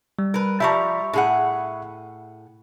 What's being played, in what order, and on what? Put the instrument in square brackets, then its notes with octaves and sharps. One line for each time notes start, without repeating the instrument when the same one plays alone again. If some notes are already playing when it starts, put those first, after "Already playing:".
[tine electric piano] G3
[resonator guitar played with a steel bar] A#4 B4
[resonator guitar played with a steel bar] F3 G3 A#5 [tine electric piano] E5 B5 C#6
[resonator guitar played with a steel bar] A2 G#4 F#5